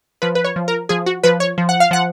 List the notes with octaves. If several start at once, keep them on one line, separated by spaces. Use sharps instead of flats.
F3 B4
B4
C#5
F3
A#4
F3 G#4
F#4
F3 B4
C#5
F3
F#5
F5
F3 F#5